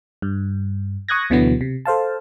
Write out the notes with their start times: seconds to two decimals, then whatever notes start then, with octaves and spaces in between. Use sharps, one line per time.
0.22 G2
1.08 C#6 D#6 F#6 G#6 A#6
1.30 D2 B2 D3 E3 F#3 B3
1.61 C3
1.85 A4 C5 F5 A5